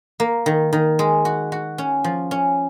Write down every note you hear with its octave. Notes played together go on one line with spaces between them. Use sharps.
A#3
D#3
D#3
G#3
F#4
F#4
C#4
F3
C#4